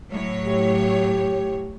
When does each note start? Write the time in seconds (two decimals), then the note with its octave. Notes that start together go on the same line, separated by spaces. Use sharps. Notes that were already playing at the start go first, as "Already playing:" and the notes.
0.10 A2 F#3 C#5
0.46 G4